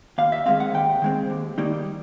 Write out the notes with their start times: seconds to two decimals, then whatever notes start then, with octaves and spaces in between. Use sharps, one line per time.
0.18 D#2 F5
0.32 E5
0.46 D#3 G#3 C4 F5
0.60 F#5
0.74 D#2 G5
1.02 D#3 G#3 C4
1.30 D#2
1.58 D#3 G3 A#3 D#4